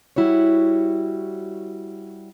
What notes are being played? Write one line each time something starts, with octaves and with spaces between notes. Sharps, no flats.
G3 E4 F#4 C#5